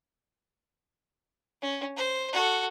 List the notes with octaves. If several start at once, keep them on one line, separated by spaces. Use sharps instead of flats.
C#4
C5
F#4 A4